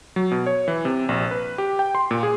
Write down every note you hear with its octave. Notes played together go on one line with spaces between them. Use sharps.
F#3
B2
C#5
E3
C3
A#1
B4
G4
G5
C6
A#2
G#4